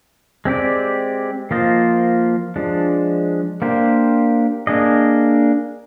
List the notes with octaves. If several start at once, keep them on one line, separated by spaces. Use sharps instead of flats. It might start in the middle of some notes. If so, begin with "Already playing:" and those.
G#3 C4 G4 D5
F3 A#3 F4 C5 D#5
F3 G#3 D4
A#3 D4 G4 C5
A#3 D4 G#4 D#5